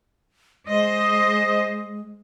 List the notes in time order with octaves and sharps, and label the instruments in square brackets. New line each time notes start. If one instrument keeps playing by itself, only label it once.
[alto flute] G#3 [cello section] C5 D#5